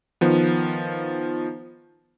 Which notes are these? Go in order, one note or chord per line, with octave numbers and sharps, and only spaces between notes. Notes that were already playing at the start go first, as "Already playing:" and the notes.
D#3 F3 B3